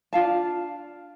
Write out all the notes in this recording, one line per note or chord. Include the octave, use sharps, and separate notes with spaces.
D4 F4 F5 A5